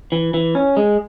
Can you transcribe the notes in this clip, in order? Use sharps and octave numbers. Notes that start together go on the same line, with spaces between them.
E3
E3
C#4
G#3